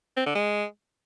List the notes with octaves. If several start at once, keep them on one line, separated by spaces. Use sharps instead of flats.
C4
D3
G#3